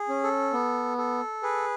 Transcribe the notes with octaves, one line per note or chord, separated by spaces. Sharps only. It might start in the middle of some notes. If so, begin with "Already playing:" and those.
Already playing: G#4
C#4
A4
B3
A4
G#4 B4